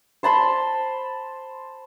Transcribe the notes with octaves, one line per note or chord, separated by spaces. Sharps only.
C5 A5 B5 C6